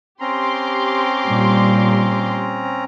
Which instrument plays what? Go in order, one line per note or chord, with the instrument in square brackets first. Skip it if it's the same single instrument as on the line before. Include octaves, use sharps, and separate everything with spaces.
[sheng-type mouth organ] C4 C#4 A#5 [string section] G4 C6 D6
[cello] A#2 G3